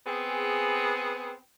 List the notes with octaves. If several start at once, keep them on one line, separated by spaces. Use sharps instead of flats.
B3 C4 G#4